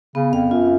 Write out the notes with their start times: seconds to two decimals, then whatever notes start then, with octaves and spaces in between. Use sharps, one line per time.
0.15 C#3 B3
0.33 F2 F5
0.51 F#2 F4